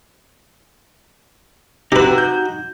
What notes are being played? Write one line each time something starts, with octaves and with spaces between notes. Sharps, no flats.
C3 D#4 F#4 G4 B4
G6